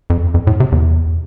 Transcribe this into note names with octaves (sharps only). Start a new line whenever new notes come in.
F2
F2
A2
C3
E2